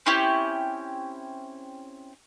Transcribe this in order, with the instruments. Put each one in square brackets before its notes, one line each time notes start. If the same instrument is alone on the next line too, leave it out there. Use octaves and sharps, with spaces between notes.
[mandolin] C4 C#4 E4 G4